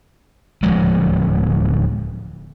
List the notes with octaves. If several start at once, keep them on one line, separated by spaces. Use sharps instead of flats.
D1 F3 G#3